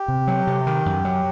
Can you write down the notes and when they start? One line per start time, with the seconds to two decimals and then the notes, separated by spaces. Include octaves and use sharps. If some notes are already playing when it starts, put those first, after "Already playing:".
Already playing: G4
0.08 C3
0.27 F#3
0.47 C3
0.67 D#3
0.86 F#2
1.05 F#3